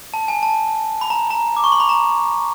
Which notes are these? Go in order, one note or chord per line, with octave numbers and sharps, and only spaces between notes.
A5
G#5
A5
B5
A#5
A#5
D6
C#6
C6
B5
A#5